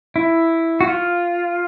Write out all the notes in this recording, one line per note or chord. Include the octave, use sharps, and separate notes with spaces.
E4
F#4
F4